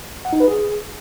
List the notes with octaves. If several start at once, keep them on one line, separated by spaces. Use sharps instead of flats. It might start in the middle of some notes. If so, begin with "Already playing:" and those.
F#5
D#4
B4
G#4